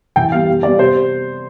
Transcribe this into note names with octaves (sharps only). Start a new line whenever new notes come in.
E3 G5
G3 B3 F5
C3
G3 B3 D5
C3 C5